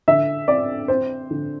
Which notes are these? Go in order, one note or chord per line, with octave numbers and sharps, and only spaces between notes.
D3 E5
C4 D5
C4 C5
D3